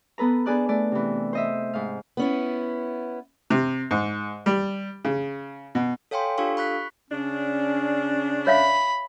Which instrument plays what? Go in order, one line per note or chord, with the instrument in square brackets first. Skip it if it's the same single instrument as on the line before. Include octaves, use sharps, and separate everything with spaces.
[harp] B3 A4 B4 A#5
B3 D4 G#4 D5 F#6
A3 D5
C3 E3
C5 D#5 E5
G#2 F5
[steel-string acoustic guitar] B3 C#4 E4
[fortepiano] C3
G#2
G3
C#3
B2
[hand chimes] A4 C#5 F5 G5 G#5 C6
D4 F4 G4 A4 F5 C#6
B5 C#6 F#6 B6
[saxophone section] C#3 D4 [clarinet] C#4
[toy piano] C#5 E5 F5 [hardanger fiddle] B5